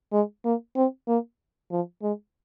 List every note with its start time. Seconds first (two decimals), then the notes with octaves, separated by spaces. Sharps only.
0.12 G#3
0.45 A#3
0.76 C4
1.08 A#3
1.71 F3
2.02 G#3